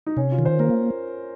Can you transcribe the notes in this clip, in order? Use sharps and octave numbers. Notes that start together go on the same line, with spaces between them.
D#4
C3 C#4
F4
D#3
C5
A#3 A#4